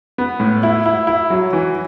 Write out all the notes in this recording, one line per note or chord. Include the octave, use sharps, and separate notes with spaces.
B3
A2
E4
E4
E4
F#3
E3